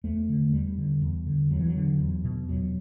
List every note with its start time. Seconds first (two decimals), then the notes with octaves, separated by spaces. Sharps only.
0.04 E2 A3
0.29 D3
0.53 E2 G3
0.78 D3
1.02 E2
1.26 D3
1.51 E2 F#3
1.59 E3
1.67 F#3
1.76 D3
2.00 E2
2.24 B2
2.49 E2 F#3